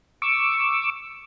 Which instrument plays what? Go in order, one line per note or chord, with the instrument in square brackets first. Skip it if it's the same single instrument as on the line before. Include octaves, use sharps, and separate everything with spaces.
[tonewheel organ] C#6 D6 E6